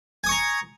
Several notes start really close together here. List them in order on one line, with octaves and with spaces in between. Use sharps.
G#5 D#6 C#6 A#5